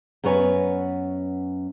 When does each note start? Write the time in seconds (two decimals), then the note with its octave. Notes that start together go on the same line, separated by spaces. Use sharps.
0.24 F#2 B3 B4 C#5 G#5